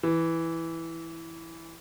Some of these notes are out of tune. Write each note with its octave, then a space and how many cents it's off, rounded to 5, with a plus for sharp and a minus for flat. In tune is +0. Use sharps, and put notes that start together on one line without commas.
E3 +0